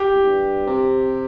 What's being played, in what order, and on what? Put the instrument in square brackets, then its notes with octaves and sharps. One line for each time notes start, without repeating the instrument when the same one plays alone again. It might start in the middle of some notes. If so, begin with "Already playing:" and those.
Already playing: [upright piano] G4
[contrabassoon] E2
G2
C3